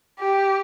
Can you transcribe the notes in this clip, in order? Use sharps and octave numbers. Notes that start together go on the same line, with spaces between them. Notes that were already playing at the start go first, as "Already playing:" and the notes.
G4